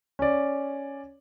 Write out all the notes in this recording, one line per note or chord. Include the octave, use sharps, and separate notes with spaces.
C#4 D5